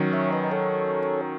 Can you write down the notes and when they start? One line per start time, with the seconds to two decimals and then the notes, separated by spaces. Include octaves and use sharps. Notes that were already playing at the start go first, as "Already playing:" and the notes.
Already playing: D#3 F#3 C#4
0.13 C#5 E5
0.33 B4 D#5
0.44 D#5
0.51 A4 C#5